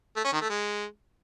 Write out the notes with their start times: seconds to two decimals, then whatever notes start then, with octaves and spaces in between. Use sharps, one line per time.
0.16 A3
0.25 C#4
0.33 D#3
0.41 A3
0.49 G#3